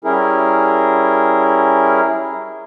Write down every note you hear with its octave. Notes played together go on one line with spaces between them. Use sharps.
G3 C#4 E4 G#4 A#4